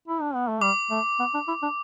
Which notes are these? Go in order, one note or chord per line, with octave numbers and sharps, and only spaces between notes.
E4
D4
B3
A3
G3 D6
A3
B3
D4
E4
D4